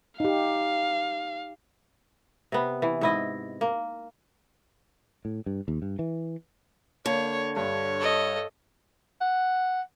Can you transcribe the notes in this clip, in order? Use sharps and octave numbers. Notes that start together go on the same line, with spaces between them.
D#4 G4 F5
C3 B3
E3
G#2 E4 D#5
A#3
A2
G2
D#2
G2
E3
D3 A#3 C#5
G2 C#5
A4 D#5
F#5